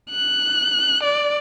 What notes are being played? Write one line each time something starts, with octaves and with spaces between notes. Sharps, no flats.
F#6
D5